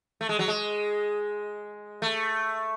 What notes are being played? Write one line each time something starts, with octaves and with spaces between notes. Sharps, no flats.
A3
G#3
F#3
G#3
A3